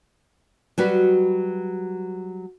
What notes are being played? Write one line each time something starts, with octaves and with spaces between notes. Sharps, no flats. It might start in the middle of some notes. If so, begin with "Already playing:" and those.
F#3 G3 F#4 B4